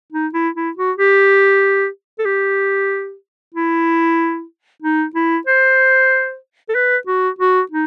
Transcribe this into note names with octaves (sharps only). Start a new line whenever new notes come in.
D#4
E4
E4
F#4
G4
A4
G4
E4
D#4
E4
C5
A4
B4
F#4
F#4
D#4